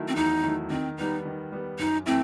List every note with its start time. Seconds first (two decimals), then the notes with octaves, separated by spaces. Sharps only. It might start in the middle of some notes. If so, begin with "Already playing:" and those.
Already playing: D#3 F#3 A3 E4
0.08 C4
0.16 E2 D#4
0.43 D#3 F#3 A3 E4
0.70 D#3 C4
0.97 G3 B3 D#4
1.25 D#3
1.52 G3 B3
1.79 F#2 D#4
2.06 E3 A3 C4 E4